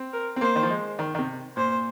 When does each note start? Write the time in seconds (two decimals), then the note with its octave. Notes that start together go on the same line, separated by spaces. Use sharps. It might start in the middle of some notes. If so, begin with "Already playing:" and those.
Already playing: C4
0.13 A#4
0.36 C4
0.41 A#3 C5
0.56 D#3
0.63 F3
0.70 G#3
0.99 D#3
1.15 D#3
1.19 C3
1.56 A#2 C5